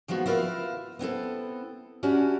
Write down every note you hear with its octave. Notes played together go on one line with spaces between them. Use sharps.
D#3 F3 G#3 B3 F#4
E4 F4 A#4 B4 D#5 F5
B3 C4 E4 A4
C#4 D4 E4 F#4 G4